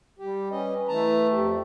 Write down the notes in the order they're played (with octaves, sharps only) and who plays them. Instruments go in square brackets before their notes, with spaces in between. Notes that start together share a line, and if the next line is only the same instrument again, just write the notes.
[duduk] G3 [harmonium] G4
[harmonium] C#4 D#5 [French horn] B4
[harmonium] E3 A5 A#5 [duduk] A3
[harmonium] F2 [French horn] G4